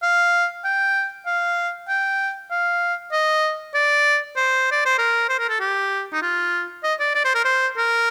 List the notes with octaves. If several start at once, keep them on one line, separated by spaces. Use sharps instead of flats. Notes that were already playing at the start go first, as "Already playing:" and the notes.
F5
G5
F5
G5
F5
D#5
D5
C5
D5
C5
A#4
C5
A#4
A4
G4
D#4
F4
D#5
D5
D5
C5
A#4
C5
A#4